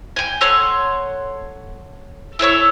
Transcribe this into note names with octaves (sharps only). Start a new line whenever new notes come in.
G5 G#5
A4 C#5 F#5 C6
E4 A4 C#5 C#6